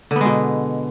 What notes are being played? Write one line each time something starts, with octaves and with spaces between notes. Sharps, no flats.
B2 D3 G#3 B3